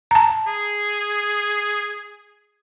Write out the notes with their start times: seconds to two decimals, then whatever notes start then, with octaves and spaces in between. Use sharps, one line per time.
0.11 A5 A#5
0.47 G#4